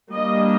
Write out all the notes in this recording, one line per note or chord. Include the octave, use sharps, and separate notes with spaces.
G3 A#3 D4 D#5